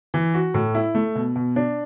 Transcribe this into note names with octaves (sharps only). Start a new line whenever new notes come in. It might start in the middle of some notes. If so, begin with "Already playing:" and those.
E3
F#4
A2
E4
A3
B2
B2
D4